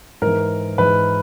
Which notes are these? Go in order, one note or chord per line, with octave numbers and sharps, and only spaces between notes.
G#2 E3 A#4
G#2 E3 B4